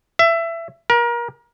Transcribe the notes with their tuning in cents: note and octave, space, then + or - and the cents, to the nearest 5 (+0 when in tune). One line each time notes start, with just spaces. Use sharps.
E5 +20
A#4 +30